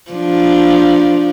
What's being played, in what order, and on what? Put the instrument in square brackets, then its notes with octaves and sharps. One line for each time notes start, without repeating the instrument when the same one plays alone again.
[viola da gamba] F3 D4